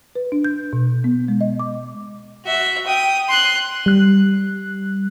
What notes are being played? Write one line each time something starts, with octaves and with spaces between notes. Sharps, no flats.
B4
D4
G6
B2
B3
G#3
D#5
D6
F#4 E5
G5 D#6
C6 F#6
G3 F#6